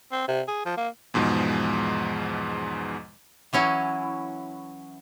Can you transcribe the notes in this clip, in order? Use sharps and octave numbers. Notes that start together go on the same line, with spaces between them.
C4
C3
G#4
F3
A#3
E2 G#2 B2 F3 G#3
E3 F#3 C#4 E4